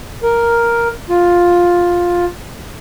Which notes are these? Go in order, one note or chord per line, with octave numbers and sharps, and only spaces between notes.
A#4
F4